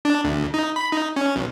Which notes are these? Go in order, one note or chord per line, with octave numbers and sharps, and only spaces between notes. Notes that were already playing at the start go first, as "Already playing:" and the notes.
D4
D2
D#4
B5
D#4
C#4
B1